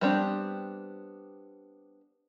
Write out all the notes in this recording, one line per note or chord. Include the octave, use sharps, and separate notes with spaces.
G3 B3 C4 D4 G4